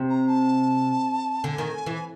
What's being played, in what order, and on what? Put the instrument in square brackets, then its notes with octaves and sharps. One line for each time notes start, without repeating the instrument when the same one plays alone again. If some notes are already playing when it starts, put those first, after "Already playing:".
Already playing: [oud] C3
[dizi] A#5
A5
[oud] D3 [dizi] G#5
[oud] D#3
E3